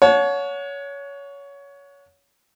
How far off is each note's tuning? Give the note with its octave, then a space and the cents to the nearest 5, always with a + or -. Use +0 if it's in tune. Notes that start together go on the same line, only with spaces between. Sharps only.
C#5 +20 F#5 -30 A5 -30